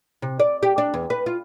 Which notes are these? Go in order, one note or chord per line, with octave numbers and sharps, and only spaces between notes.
C3
D5
G4
D4
E2
B4
F4